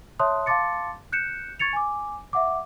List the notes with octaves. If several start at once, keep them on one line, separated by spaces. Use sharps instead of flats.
C#5 E5 A5 C6 D#6 F#6
F5 A5 C6 D6 A6 C#7
F#6 G6 C#7 E7
C#6 G#6 A6 C#7 F7
G#5 D6
E5 F#5 D6